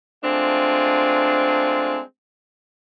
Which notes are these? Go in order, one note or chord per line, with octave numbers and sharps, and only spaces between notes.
G#3 A3 C4 D4 F4